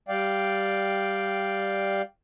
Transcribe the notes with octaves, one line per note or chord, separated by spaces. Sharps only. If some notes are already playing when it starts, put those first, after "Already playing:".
G3 D5 F5 G5